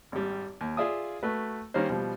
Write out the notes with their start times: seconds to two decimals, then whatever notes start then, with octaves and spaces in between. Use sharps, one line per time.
0.12 G#1 G3
0.61 D#2
0.77 F4 G#4 D5 E5 F5 D#6
1.23 A3 F#4 B4
1.74 D#3 G3 A#3 C#4 C5
1.90 B2 F3 G3